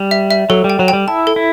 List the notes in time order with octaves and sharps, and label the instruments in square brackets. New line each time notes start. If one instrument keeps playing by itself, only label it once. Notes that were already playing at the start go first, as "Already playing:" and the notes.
Already playing: [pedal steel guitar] G3
[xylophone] E5
E5
[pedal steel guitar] F#3 [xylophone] A4
[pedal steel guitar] G3
[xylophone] G5
[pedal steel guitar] F#3
[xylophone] G5
[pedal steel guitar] G3
[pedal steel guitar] E4 [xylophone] A5
[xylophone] A4
[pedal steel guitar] E4